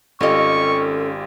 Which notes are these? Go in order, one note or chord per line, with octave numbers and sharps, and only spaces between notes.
G#1 C#4 F4 G4 A4 D#5 C#6